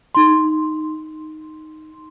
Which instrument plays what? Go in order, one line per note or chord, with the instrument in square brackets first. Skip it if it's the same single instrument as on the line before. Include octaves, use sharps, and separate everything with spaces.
[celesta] D#4 C6